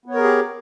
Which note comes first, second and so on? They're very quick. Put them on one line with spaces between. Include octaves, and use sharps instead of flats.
B3 C#5 A#4 G#4 G4